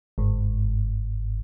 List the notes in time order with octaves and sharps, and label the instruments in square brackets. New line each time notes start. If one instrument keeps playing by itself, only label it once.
[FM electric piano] G1 G#2